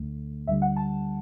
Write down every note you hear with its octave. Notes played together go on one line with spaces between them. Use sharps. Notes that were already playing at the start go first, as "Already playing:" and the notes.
Already playing: D2 D3 A3
D2 D3 G3 E5
F#5
A5